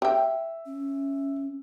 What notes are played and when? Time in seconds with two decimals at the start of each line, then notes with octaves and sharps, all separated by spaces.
0.02 G4 E5 G5
0.66 C#4